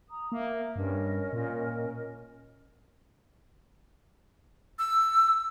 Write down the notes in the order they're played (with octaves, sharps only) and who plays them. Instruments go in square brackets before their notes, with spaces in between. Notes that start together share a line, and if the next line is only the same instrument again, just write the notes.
[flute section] A#5 D#6
[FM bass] A#3 [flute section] E5
[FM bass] G2 [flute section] C#4 A#4 D#5
[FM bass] A#2
[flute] E6